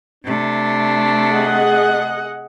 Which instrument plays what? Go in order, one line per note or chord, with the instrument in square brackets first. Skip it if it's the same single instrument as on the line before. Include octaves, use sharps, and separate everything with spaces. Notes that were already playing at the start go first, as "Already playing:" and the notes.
[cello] C3 A3 [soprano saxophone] D4
[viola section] G#4 D#5 F#5